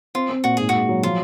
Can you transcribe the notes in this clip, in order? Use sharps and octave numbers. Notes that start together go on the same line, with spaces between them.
C4 F4
C4
A#2 F#4
G#2 G#4
G#2 F#4
F#3
F3 F4